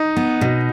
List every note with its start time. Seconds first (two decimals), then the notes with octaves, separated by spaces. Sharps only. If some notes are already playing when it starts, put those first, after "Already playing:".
Already playing: D#4
0.17 B3
0.41 B2